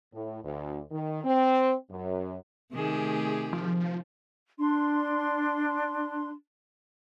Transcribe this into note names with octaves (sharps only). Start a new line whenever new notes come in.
A2
D2
D#3
C4
F#2
C3 D#3 A3 G4 G#4
F3
D4 C6